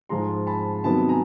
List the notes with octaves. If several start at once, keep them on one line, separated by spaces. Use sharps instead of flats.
G#2 F3 G#3 A#5 C6
A5 B5
C3 D#3 F#3 B3 A5 B5
G#5 A#5